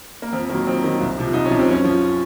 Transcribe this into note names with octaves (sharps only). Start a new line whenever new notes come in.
A#3
F2 C4
D#3 F#3 A#3
F2 C4
D#3 F#3
C2
C3 F3
C2 D#4
C#4
C3 F3
C4
F#2 C#4
F3